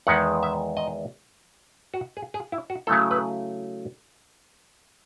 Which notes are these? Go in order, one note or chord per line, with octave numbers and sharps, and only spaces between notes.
E2 D#3 G#3 B3 F#5
E5
D#5
F#4
G#4
G#4
E4
F#4
C#3 F#3 A3 E4 A4
B4